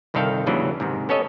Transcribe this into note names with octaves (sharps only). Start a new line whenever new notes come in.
G1 C2 D#3 A4 F5 G5
D#2 G#2 C#3 E3 F#3 D4
G#2 C3 D#3
B3 C#4 A4 C#5 D#5